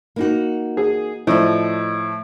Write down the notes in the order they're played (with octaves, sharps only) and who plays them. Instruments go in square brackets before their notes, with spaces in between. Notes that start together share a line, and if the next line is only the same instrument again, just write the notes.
[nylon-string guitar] A#3 D#4 F#4
[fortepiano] G#4
[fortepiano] A2 F3 [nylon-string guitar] D5 D#5